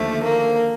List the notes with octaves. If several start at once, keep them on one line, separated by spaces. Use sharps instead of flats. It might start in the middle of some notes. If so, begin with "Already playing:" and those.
Already playing: D#2 D3 F3 A3
A#3